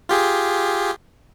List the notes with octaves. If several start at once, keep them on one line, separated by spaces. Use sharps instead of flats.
F4 G4 G#4